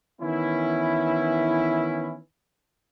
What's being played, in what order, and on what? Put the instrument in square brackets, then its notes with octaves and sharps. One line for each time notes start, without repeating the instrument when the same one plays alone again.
[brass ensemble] D#3 E3 B3 C#4 E4